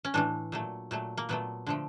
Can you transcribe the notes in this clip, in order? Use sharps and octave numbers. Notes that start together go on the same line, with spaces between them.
C#4
A2 E3 A3 D4
A#2 F#3 A3
A#2 F#3 A3
A#3
A#2 F#3 A3 B3
D3 F3 A3